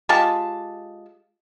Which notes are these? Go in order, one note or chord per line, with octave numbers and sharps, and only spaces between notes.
G#3 F4 G4 A5